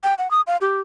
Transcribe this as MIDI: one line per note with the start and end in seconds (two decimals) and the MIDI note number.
0.03 0.14 79
0.18 0.30 78
0.31 0.41 87
0.47 0.57 77
0.61 0.81 67